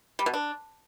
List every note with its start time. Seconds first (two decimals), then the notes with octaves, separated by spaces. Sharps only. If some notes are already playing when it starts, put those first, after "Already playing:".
0.19 G3
0.26 B2
0.34 D4